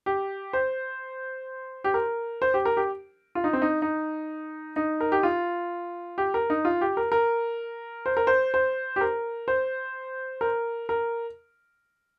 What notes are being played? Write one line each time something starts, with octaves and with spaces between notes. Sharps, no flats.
G4
C5
G4
A#4
C5
G4
A#4
G4
F4
D#4
C4
D#4
D#4
D#4
A#4
G4
F4
G4
A#4
D#4
F4
G4
A#4
A#4
C5
A#4
C5
C5
G4
A#4
C5
A#4
A#4